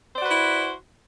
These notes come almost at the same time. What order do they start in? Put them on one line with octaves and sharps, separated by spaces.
C5 D5 F#4 B4 E4